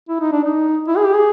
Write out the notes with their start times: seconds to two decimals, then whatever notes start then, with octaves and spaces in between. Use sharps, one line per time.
0.09 E4
0.21 D#4
0.32 D4
0.44 D#4
0.88 E4
0.97 G#4
1.05 G4
1.14 G#4